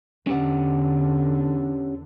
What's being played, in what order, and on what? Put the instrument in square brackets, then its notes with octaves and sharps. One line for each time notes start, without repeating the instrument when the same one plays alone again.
[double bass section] E2 D3 [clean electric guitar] C#4 G4 F#5